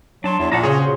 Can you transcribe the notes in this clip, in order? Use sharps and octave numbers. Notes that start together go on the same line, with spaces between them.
F#3 D4 A5 C6
E2 E4
A#1 A#2 F#5 A5 A#5
C#3 F4 F#4 G#4 C5 C#5